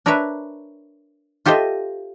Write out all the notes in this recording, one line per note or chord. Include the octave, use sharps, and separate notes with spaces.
D4 A#4 B4 C#5 E5
F4 G4 A4 C5 D#5 E5